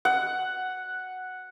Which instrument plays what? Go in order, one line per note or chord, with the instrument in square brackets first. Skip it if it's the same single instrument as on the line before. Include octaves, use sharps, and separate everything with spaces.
[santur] F#5